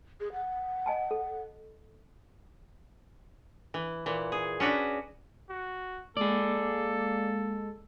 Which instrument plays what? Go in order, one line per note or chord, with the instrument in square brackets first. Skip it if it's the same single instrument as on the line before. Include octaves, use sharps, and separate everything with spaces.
[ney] G#4
F#5
[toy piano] D#5 G#5 A5
A4
[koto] E3
A#2 E3
G#4
C#4 D4 F#4 B4
[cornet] F#4
[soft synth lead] G#3 [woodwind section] A#3 [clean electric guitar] G#4 D5 [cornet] A4